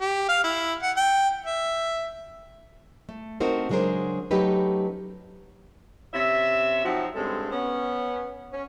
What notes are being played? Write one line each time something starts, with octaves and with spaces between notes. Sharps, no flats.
G4
F5
E4
F#5
G5
E5
A3
A3 C4 D#4 F#4 A#4 C5
C#3 F#3 G#3 D4 A#4 C5
F#3 A3 C#4 D#4 G4 B4
C3 C#4 E5
F3 F#3 C4 D#4 F#4
G2 C#3 G#3 C4 A4
B3 C#4
C#4